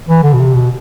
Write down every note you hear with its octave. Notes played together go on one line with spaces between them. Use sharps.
E3
D3
B2
C3
B2